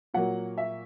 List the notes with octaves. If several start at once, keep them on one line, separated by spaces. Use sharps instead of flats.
A#2 F#3 A#3 F#5
E5